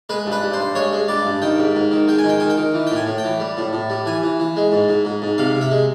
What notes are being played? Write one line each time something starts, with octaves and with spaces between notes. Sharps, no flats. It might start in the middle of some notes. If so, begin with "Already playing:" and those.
G#3 B4
G2
B4
G2
C5
G2
G#3 C#5
G#3
G2 D5
G2
D#3 G5
G#2
G#2
D#3
G#3 G5
G#5
D#3
G5
D#3 G#5
G5
D#3
E3
A2 G5
G#5
A2
G5
E3
G3
A2
A2
G3
E3 G#5
E3
E3
G#3
G#2
G#2
G#2
G#2
C3 F5
C3
E5
G#3